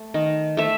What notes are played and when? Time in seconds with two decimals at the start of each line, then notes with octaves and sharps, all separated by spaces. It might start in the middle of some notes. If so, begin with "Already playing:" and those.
Already playing: A3
0.14 D#3
0.57 A3 E5